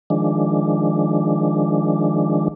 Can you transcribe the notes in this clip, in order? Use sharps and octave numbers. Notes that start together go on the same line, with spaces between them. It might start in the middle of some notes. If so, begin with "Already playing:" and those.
D#3 F3 G#3 D4